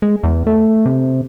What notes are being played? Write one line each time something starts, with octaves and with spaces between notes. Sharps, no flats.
G#3
E2
A3
C3